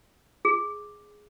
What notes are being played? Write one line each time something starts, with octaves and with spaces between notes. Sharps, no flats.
G#4